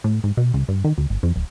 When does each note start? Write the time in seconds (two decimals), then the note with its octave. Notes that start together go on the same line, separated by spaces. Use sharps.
0.04 A2
0.24 G#2
0.37 B2
0.54 C#2
0.68 G2
0.84 D#3
0.98 D2
1.10 G#1
1.23 F2
1.36 D1